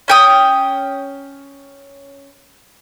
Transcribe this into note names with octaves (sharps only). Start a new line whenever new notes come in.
C#4 G5 D#6